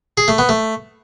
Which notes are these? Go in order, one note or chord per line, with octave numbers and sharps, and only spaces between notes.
G#4
A3
B3
A3